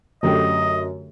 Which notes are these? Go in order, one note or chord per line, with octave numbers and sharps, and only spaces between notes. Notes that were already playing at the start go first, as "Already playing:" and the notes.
F#2 D3 A3 G4 D#5